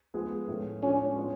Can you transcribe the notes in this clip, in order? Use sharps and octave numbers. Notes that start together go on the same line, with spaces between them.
F3 G#3 B3 F4 G#4
A2 F3 A3 C#4
A2 F3 G#3 C#4 D4
G#3 B3 F4